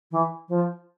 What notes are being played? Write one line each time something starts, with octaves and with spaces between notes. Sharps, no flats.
E3
F3